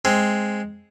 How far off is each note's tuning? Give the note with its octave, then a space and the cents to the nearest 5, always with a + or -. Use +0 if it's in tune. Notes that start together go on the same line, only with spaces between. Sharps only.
G#3 +0 C4 +0